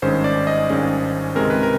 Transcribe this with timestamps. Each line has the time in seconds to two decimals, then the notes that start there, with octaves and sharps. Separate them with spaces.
0.02 G#1 G2 D#3 G#3 C#4 C5
0.24 D5
0.47 D#5
0.70 G#1 G2 D#3 G#3 C#4
1.35 C#2 C3 D#3 G#3 C4 A#4
1.50 B4
1.63 A#4